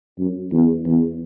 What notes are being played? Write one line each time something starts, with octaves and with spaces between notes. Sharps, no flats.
F#2
E2
E2